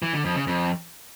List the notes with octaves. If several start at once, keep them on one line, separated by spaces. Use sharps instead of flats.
E3
D3
F2
C#3
F2